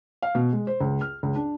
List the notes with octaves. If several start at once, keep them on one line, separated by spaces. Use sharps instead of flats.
F5
B2
G#3
C5
C#2
F6
C#2
D4